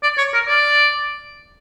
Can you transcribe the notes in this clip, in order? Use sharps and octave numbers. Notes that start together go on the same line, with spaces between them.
D5
C#5
A#4
D5